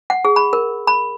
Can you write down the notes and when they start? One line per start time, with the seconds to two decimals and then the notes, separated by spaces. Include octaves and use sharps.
0.10 F#5
0.25 G#4
0.36 B5
0.53 A#4
0.87 B5